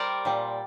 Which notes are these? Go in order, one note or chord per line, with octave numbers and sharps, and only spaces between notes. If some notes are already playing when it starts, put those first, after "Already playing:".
Already playing: G3 G4 A#4 C5 D5
A#2 G3